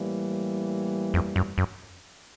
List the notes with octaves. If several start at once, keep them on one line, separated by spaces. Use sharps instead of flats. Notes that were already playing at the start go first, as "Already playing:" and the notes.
Already playing: A2 E3 G3 A#3
F2
F#2
F#2